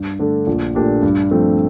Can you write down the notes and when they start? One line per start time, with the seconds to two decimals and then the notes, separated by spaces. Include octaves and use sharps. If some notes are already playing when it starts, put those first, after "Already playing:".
Already playing: G2
0.19 D3 A3 D4 A4
0.47 A#1
0.75 A#2 A3 D4 G4
1.03 G2
1.31 F3 A3 C4